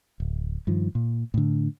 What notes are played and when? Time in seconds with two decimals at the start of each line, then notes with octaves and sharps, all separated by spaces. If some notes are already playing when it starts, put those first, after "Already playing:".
0.20 D1
0.67 G2 D#3 F3
0.95 A#2
1.34 A2 D3